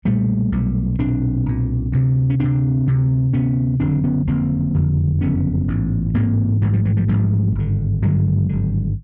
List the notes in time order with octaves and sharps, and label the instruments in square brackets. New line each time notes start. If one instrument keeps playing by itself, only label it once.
[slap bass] B1 A#2 G3 A3
B1 A#2
B1 A#2 C4 D4
B1 A#2
D2 C3
C#4
D2 C3 C4 D4
D2 C3
D2 C3 B3 C#4
F#1 F2 D3 C4 D4
B3 C#4
F#1 F2 D3 A#3 C4
F#1 F2 D3
F#1 F2 D3 B3 C#4
A1 G#2
A1 G#2 A#3 C4
A1 G#2 E3 F#3
F3 G3
E3 F#3
F3 G3
A1 G#2 F3 G3
G#1 G2 D3
G#1 G2 D3 F#3 G#3
G#1 G2 D3